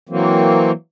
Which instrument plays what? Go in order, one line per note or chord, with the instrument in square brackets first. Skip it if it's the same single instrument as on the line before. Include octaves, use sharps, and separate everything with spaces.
[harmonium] E3 F#3 A#3 C4